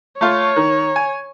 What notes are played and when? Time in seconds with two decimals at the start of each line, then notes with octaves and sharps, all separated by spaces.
0.21 A3 F4 C#5
0.56 D#3
0.96 G#5